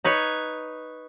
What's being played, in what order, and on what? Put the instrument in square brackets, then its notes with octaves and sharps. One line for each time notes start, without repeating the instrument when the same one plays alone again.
[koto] D#4 B4 C#5